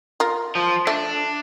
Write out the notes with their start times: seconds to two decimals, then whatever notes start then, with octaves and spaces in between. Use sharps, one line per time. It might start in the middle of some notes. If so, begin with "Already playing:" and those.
0.20 F4 A#4
0.55 F3
0.87 A3 D4 E5